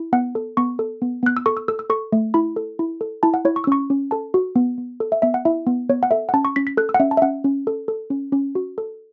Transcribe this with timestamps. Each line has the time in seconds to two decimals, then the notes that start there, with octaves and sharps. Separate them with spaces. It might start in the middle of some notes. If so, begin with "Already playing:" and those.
Already playing: E4
0.13 B3 F#5
0.35 A4
0.57 B3 C#6
0.79 A4
1.02 B3
1.23 B3 F#6
1.37 E6
1.46 A4 C#6
1.57 E6
1.68 A4 E6
1.79 E6
1.90 A4 C#6
2.13 A3
2.34 E4 B5
2.56 A4
2.79 E4
3.01 A4
3.23 E4 A5
3.34 F#5
3.45 E4 C#5
3.56 C#6
3.64 E6
3.67 C#4 C#6
3.90 C#4
4.11 A4 A5
4.34 F#4
4.56 B3
4.78 B3
5.00 A4
5.12 E5
5.22 B3 E5
5.34 F#5
5.45 E4 E5
5.67 B3
5.89 B3 C#5
6.03 F#5
6.11 A4 E5
6.29 F#5
6.34 C#4 A5
6.45 C#6
6.56 C#4 B6
6.67 B6
6.77 A4 F#6
6.89 E6
6.94 F#5
7.00 C#4 E5
7.11 A5
7.17 E5
7.22 C#4 F#5
7.44 C#4
7.67 A4
7.88 A4
8.10 C#4
8.32 C#4
8.55 F#4
8.78 A4